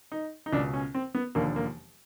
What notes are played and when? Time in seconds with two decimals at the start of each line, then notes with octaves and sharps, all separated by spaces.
0.12 D#4
0.46 D#4
0.53 C#2 B2 D4
0.74 C#4
0.95 C4
1.15 B3
1.35 E1 D#2 D3 F3 A#3
1.56 A#3